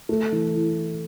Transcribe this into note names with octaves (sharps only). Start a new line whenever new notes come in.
A3
E3
E4